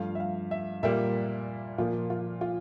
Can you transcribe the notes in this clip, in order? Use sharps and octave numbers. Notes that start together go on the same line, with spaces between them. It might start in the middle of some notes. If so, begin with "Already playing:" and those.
Already playing: G2 F3 A3 F5
E5
F5
E5
A#2 G3 A#3 E5
A#2 F3 A#3 F4
F4
F4